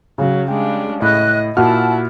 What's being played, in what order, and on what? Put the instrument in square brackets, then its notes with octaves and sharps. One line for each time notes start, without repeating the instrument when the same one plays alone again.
[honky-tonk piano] C#3 [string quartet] F#3
[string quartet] G3 G#3 D4 [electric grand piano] G5
[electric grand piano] A2 B5 [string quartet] D#5 [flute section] F#6
[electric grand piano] A#2 F6 [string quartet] E4 [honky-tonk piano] F#4 [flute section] A5